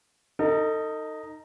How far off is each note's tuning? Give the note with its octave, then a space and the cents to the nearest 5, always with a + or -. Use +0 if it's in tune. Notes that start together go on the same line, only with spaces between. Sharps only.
D#4 +0 A4 +40